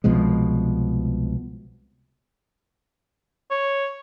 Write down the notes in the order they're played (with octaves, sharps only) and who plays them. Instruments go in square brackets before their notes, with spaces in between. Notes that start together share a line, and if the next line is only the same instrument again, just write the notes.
[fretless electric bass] C2 B2 F3 G#3
[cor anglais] C#5